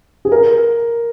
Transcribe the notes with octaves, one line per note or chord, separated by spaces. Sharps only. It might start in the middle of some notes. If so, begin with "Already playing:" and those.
G#4
A#4